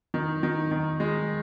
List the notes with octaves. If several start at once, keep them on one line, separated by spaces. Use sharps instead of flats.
D#3
D#3
D#3
G#3